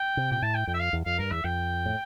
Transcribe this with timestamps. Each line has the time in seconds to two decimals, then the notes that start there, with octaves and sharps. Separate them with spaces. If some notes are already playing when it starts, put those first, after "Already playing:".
Already playing: G5
0.17 C3
0.31 A#2 G5
0.42 A2 A5
0.55 G5
0.67 F2 G5
0.74 E5
0.80 F5
0.93 E2
1.06 F2 F5
1.19 G2 A#4
1.31 E2 E5
1.44 F2 G5
1.86 A2